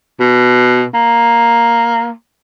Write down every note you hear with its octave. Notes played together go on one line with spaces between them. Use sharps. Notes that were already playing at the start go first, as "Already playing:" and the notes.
B2
A#3